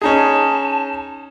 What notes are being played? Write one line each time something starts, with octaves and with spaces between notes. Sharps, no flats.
C#4 D#4 G#4 A5